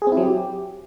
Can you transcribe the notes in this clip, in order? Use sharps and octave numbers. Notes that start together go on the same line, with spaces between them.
G#4
C4
E4
F#3
G4